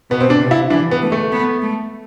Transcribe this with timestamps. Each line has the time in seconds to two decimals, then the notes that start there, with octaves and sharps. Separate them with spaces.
0.10 B2 B3
0.20 C4
0.30 D4
0.40 C3
0.51 E4
0.70 E3 D4
0.91 B3
1.02 A3
1.12 A3
1.32 B3
1.62 A3